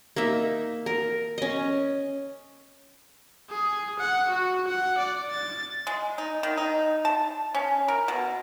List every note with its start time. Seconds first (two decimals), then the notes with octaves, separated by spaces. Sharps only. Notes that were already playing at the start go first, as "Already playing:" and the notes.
0.16 A#3 D#4 E5
0.86 A#4
1.38 C#4 D#5
3.50 G#4
3.99 F#5
4.30 F#4
4.68 F#5
4.98 D5
5.31 A6
5.87 G#3
6.18 D#4
6.43 D#3
6.57 D#4
7.05 A5
7.55 C#4
7.88 A#4
8.08 B2